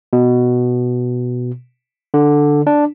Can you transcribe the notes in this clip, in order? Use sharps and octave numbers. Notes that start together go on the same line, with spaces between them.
B2
D3
D4